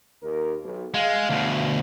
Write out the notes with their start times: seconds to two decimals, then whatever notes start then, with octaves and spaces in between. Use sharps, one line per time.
0.22 D#2 A#4
0.63 B1
0.94 G#3 F5
1.29 D2 B2